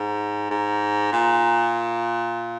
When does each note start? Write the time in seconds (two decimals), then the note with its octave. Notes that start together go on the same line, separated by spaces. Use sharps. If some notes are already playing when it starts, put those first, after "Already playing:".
Already playing: G#2
0.50 G#2
1.12 A#2